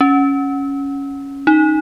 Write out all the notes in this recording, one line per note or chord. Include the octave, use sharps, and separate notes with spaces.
C#4
D#4